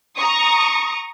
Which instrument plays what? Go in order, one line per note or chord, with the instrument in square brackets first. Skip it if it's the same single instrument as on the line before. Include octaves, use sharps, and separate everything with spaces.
[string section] A#5 C#6 D#6